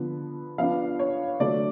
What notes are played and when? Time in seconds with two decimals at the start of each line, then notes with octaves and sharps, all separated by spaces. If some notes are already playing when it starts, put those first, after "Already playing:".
Already playing: D3 F3 B3
0.58 F3 B3 D4 F5
0.99 C#5
1.40 D3 F#3 A3 D4 D5